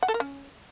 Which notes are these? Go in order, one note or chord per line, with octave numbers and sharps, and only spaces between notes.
F#5
A4
A#4
C#4